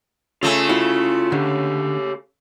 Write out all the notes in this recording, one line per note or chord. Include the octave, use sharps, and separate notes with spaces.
C#3 A3 F4 G#5
E4 F#4
D3 G4 C#5